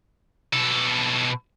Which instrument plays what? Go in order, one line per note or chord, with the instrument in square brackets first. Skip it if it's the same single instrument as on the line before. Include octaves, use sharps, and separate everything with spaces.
[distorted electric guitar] B2 A4